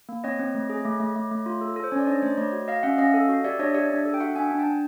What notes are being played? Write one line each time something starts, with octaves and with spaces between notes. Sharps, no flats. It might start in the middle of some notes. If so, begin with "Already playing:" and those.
A#3
C4 C#5 D#5
C4
A3
G#4
A3
A3
A3
A3
F4
A4
A4
C5
C#4 C#5
D5
D4 C#5 D#5
A3 C5 D5
A3 C#5 D#5
F#4
F#4 D#5 F5
C#4 E5 F#5
C#4 D#5 F5
A4
F#4
G4 D5 E5
D4 C#5 D#5
G4 D5 E5
D4
A4
G5
F#4 E5 F#5
D4 F#5 G#5
D4
G5 A5
D4